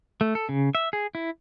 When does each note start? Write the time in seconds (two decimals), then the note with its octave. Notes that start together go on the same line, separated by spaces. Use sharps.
0.21 A3
0.35 A4
0.49 C#3
0.75 E5
0.93 G#4
1.15 E4